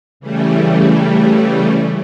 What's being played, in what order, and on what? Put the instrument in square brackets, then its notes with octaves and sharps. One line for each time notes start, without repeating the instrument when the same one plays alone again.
[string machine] C#3 E3 G3 A3